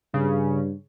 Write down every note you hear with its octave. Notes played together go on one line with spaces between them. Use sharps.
G2 C#3